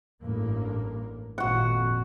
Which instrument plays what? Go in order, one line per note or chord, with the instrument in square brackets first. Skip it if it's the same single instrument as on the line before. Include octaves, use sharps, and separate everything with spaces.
[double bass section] A1 G2 A#3
[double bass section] G#1 F2 A#2 [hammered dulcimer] F#4 F#5